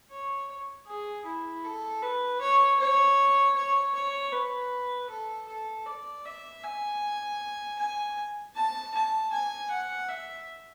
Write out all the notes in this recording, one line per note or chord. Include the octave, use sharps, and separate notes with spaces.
C#5
G#4
E4
A4
B4
C#5
C#5
C#5
C#5
B4
A4
A4
D5
E5
G#5
G#5
A5
A5
G#5
F#5
E5